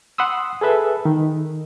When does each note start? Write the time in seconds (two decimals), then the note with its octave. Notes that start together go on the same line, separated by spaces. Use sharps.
0.18 F#5 B5 C6 D#6 E6
0.61 G#4 A4 B4 E5
1.05 D#3